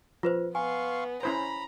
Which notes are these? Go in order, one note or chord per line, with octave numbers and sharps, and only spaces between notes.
F3 F4 B4 C5
B3 F5 G#5 C6 C#6
C#4 E4 C5 A#5 B5